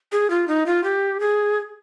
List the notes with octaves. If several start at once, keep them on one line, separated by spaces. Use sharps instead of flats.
G#4
F4
D#4
F4
G4
G#4